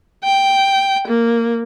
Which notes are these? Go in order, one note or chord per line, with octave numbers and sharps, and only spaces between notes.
G5
A#3